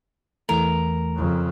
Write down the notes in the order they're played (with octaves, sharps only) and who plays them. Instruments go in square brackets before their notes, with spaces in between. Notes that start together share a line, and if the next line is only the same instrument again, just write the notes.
[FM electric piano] E2 E3 A3 [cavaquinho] A#4
[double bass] F2 C#3